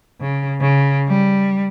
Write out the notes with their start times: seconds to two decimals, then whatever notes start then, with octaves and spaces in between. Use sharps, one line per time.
0.21 C#3
0.61 C#3
1.08 G3